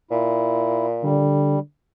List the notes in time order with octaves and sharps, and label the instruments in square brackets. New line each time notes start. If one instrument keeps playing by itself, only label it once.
[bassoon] A#2 [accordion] E4
[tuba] D3 [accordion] G3